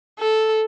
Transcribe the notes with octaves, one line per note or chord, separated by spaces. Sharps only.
A4